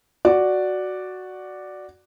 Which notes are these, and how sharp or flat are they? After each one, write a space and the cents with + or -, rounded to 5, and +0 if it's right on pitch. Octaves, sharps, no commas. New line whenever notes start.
F#4 +0 D5 +0